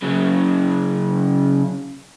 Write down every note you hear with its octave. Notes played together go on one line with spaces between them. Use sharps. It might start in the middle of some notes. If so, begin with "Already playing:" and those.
C#3 F#3